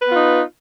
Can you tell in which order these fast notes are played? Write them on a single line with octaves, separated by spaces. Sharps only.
B4 B3 F4 D#4